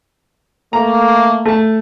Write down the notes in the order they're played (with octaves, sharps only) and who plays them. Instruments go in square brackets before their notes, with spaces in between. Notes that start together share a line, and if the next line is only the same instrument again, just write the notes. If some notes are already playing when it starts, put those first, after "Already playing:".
[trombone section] A3 A#3 [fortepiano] A#5
[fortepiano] A3 A5